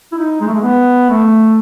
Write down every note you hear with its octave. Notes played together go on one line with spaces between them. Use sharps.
E4
D#4
G#3
A3
G#3
B3
A3